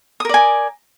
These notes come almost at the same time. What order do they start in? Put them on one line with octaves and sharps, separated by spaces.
D#6 A#4 D5 G#5